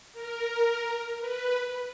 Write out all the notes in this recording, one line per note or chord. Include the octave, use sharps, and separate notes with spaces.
A#4
B4